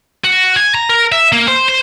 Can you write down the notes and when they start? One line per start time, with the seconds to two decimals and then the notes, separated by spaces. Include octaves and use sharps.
0.24 F#4
0.56 G#5
0.74 A#5
0.89 A#4
1.12 E5
1.32 A#3
1.48 C5
1.68 C5